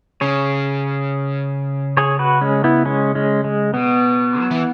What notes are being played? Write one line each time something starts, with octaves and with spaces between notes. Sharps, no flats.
C#3 G#4 C#5
G#4 C#5
F#4 B4
G#3 C#4
B3 E4
G#3 C#4
G#3 C#4
G#3
B2 B3
F#3
E3